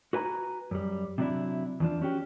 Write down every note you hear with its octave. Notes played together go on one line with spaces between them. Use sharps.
F#4 B4 G#5 A#5
F#2 G3
C3 F#3 D4 E4
E2 F3 D4
C#4 F#4 G4